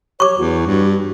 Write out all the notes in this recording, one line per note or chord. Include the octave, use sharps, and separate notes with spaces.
C#5 C#6 D6
E2 F#4
G2